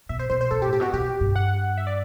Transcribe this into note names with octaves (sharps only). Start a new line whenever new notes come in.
B2 E5
C5
B2 C5
C5
B2 A4
G4
A2
G4
B2 F#4
B2 G4
G2
F#5
E5
D5